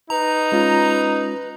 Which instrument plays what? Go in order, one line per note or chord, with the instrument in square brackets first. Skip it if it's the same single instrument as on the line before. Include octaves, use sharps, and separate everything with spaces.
[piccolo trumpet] D#4 [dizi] B4 [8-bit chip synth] A#5
[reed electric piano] G#3 C#4 F4